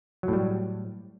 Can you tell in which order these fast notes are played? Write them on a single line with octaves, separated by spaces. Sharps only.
F#3 A2 G3